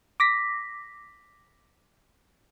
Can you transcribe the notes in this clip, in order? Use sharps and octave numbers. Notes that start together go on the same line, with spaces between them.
D6 A#6 B6